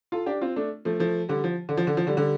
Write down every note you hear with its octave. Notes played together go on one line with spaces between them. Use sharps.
F4 A4
D4 G4
C4 F4
A3 D4
F3 A3
F3 A3
D3 G3
F3
D3
F3
D3
F3
D3 G3
D3 G3